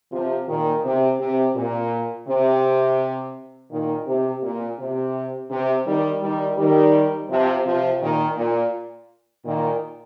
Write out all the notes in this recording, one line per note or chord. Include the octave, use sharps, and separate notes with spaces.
C3 F3
A#2 D#3
C3
C3
A#2
C3
A#2 D#3
C3
A#2
C3
C3
D#3 G3
D#3 G3
D#3 G3
C3 F3
C3 F3
A#2 D#3
A#2
A#2 D#3